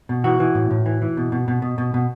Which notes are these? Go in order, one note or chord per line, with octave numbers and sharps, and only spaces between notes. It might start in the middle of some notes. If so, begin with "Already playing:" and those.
B2
E3 F#4
E3
A2
A2
E3
E3
B2
B2
B2
B2
B2
B2